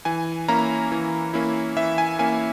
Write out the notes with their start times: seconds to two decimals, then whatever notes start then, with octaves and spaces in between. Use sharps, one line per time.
0.05 E3 G#5
0.48 A#3 C#4 E4 A#5
0.92 E3
1.34 A#3 C#4 E4
1.76 E3 E5
1.98 G#5
2.19 A#3 C#4 E4 G#5